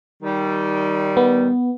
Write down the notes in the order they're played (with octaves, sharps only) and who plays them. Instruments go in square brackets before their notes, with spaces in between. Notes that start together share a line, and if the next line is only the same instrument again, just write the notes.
[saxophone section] D#3 G3
[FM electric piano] B3